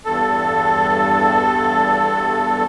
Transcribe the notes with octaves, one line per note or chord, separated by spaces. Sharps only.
E2 G2 A4